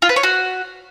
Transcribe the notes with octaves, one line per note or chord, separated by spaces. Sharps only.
F4
B4
C#5
F#4